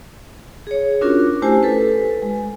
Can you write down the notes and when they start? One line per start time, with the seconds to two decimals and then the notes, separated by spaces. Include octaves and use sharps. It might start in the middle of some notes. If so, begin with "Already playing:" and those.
0.67 G#4 C#5
1.01 C#4 D4 F4 F#4 A#4
1.42 A3 E4 G4 C5 G#5
1.63 A4 B4
2.22 G#3